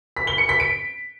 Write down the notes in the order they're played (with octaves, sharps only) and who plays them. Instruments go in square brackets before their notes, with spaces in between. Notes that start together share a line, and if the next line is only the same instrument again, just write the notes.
[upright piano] B6
G7
C#7
B6
D7